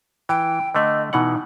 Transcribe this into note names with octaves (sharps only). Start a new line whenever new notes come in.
E3 G5
D3 A3 D#5
B2 E3 D#4 F#5